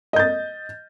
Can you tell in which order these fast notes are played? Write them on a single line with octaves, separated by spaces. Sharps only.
D#5 G6 A6